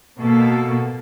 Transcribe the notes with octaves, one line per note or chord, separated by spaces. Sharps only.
B2 A#3 A4